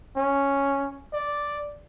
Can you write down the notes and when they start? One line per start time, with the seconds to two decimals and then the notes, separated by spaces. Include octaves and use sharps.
0.16 C#4
1.13 D5